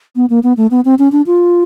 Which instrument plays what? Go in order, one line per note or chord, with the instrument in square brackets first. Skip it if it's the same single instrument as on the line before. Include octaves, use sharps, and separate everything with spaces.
[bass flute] B3
A#3
B3
A3
B3
C4
C#4
D4
F4